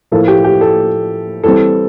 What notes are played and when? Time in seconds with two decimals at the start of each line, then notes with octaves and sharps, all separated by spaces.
0.12 A2 F3 A#3 E4 A4
0.28 G4
0.44 G4
0.61 A4
1.44 E3 G3 C4 A4